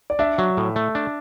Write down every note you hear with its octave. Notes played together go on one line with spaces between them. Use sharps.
D5
D4 E5
F#3
A2
A3
D4